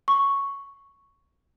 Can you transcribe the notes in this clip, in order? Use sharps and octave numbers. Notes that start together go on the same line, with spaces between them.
C#6